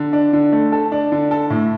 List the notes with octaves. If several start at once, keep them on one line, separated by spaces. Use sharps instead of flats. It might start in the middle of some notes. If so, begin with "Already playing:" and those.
Already playing: D3
D4
D3
A3
A4
D4
D3
A4
A2